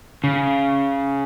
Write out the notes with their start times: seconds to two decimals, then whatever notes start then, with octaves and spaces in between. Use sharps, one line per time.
0.24 C#3